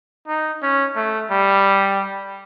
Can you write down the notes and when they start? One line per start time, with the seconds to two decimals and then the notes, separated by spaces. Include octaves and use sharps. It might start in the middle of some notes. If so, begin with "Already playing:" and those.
0.27 D#4
0.62 C#4
0.96 A3
1.31 G3